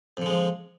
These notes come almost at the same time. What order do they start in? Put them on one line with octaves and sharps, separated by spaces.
F2 D3 G#3 F3